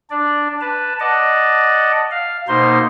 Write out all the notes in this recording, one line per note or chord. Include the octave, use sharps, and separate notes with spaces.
D4 D5
B4 A5
D5 D#5 F#5 A5
F5
B2 A#3 D#4 C5 C6